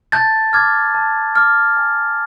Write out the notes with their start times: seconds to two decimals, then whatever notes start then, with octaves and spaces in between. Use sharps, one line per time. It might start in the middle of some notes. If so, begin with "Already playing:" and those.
0.12 A5 G6 A6
0.53 D6 F6 G#6
0.95 A5
1.36 D6 F6
1.77 G#5